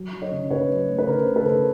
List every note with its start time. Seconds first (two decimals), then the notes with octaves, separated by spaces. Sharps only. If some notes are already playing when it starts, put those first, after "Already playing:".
Already playing: F#3
0.13 F#3
0.22 C#5 D#5
0.32 C#3
0.50 C#3 B4 C#5
0.70 F#3
0.88 A3
0.99 B4
1.07 C#3 A#4 C5
1.27 A3
1.36 A4 B4
1.45 C#3